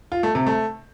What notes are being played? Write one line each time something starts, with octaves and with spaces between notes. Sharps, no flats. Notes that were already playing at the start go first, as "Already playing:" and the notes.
F4
A3
C3
A3